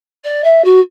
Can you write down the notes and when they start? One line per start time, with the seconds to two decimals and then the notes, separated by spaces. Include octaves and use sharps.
0.24 D5
0.44 E5
0.64 F#4